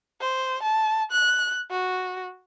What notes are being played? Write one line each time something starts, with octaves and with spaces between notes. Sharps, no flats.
C5
A5
F#6
F#4